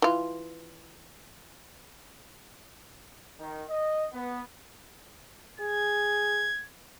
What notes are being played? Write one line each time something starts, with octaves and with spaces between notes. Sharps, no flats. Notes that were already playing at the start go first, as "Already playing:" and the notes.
E3 F4
D#3
D#5
B3
G#4 G#6